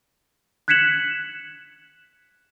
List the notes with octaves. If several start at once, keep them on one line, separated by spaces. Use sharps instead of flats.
F#6 G#6 B6 C#7 E7 F#7